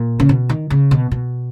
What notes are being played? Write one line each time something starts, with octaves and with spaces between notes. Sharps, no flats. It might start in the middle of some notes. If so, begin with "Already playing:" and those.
Already playing: A#2
C#3
B2
D#3
C#3
B2
B2